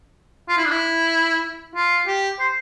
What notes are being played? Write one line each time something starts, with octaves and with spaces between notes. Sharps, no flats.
F4
E4
D4
E4
F4
G4
C5